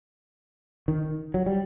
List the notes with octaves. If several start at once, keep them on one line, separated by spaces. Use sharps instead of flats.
D#3
F#3
G3